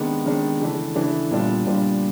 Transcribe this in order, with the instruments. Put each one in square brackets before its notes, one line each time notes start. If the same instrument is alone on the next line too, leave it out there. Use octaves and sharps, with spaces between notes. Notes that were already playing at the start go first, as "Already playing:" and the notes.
Already playing: [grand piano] C3 D#3 G#3 B3 D4
C3 D#3 G#3 B3 D4
C#3 E3 A3 D4
C#3 E3 A3 D4
A#2 G3 B3 D4 F4
A#2 G3 B3 D4 F4